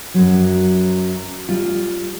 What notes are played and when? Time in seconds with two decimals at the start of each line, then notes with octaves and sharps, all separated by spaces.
0.14 F#2 F#3
1.49 G3 F4